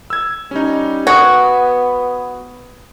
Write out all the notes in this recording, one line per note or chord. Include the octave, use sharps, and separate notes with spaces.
E6 G#6
G3 C#4 D#4
B3 F#4 D#6 G#6